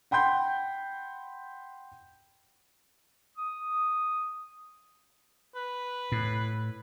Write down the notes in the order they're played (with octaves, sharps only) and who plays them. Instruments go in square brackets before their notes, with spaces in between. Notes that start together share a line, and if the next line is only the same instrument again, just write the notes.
[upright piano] F#5 G5 B5 C6 G6
[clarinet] D#6
[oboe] B4
[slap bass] A2